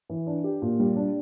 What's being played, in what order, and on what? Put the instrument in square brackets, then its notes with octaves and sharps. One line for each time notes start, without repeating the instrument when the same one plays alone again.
[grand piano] E3
D4
G4
A#2
G3
D4